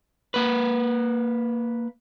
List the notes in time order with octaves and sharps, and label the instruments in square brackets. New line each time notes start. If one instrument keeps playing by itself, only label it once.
[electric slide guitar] A#3 B4